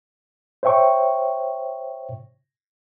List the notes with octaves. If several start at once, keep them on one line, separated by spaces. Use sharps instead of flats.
C5 C#5 E5 G5 C#6